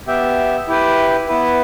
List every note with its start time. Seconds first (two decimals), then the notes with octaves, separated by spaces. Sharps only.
0.07 B3 G4 E5
0.67 E4 G4 B4
1.28 B3 E4 B4